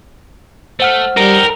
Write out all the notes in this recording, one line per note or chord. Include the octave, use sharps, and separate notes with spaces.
A3 C5 F#5 F6
G3 D#4 G4 A#4